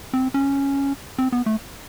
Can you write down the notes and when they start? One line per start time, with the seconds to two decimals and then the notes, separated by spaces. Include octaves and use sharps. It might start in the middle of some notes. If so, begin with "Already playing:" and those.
0.13 C4
0.34 C#4
1.19 C4
1.32 B3
1.46 A3